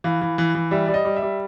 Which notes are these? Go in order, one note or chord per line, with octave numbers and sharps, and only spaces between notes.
E3 F5
E3
E3
E3
G3 E5
G3 D5
D#5
G3
E5
G3